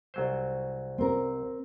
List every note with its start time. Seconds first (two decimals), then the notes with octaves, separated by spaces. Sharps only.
0.14 C2 F#3 C5
0.98 C4 A#4